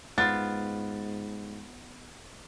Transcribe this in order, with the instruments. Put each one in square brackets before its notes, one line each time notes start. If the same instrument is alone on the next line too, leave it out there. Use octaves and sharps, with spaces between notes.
[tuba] G#2 [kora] B3 F4 [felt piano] A6